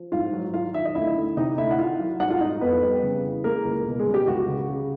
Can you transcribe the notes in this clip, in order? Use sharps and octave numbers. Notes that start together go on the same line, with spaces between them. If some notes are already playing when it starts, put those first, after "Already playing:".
Already playing: F3
G#2 F4 F5
F#3
D#3 F4 F5
D#3 E5
D#5
D2 E4 E5
D2
C3 D#4 D#5
D2 E4 E5
F#5
D#3 F4 F5
F#3
G#2 F#4 F#5
F4 F5
G#2 D#4 D#5
F2 B3 B4
G3
C#3
E3
G#3 A#3 A#4
C#2
B2
G#3 G#4
C#2
G4
C#2 F#4
C#3
C#3